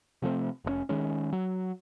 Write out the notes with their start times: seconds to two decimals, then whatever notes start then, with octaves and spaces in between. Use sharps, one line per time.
0.22 C3 F3 A3 C4
0.64 F1 A2 C#4
0.89 D#3 G#3 C#4
1.33 F#3